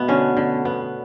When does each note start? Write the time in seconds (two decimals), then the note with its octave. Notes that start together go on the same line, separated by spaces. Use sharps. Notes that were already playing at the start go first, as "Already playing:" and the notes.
Already playing: B2 A3 B3
0.08 D3 C#4
0.37 D3
0.65 B3